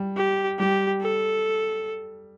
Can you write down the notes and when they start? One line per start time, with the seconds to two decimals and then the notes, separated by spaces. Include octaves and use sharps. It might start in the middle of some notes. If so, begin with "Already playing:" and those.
Already playing: G3
0.17 G4
0.59 G3 G4
1.02 A4